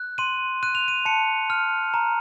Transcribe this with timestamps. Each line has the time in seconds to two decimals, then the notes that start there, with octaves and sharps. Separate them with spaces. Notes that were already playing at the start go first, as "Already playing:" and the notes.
Already playing: F#6
0.18 C6 D#7
0.63 F#6 D#7
0.75 F7
0.88 D#7
1.05 A5 C#7
1.50 F6
1.94 A#5